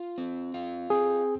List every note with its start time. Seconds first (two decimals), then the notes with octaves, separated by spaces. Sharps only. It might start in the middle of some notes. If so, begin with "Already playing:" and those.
Already playing: F4
0.18 C4
0.54 F4
0.90 C4 G#4